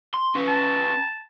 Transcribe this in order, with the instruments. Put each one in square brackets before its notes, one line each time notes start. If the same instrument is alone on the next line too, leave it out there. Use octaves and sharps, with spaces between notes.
[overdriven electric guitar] C6
C#4 B4
[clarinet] A5